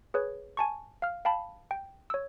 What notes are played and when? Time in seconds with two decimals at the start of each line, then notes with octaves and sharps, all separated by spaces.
0.14 G#4 B4 C#5
0.57 G#5 A5 C#6
1.02 F5 F6
1.25 F5 G5 A5 B5
1.71 G5
2.10 C#5 E6